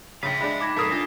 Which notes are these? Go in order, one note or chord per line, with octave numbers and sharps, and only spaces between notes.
A#1 C#3 F5 G5 B6
G#3 D4 E5 B5
D#4 B5 D6 G#6 A#6
G2 C3 A4 A#4 D#6 B6 C7
D4 F4 A#6